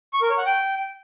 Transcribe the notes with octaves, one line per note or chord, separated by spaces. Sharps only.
C#6
A#4
C#5
F#5
G5